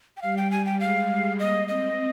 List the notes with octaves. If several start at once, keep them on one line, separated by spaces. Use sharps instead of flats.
G5
G3 F5
G5
G#5
G5
G#3 F5
A#3 D#5
C4 D#5